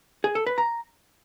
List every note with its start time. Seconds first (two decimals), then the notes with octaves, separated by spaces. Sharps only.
0.24 G#4
0.35 A4
0.46 B4
0.58 A#5